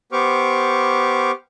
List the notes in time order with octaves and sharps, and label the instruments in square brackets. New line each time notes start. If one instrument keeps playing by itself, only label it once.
[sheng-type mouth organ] B3 G4 C5 C#6 D6 F6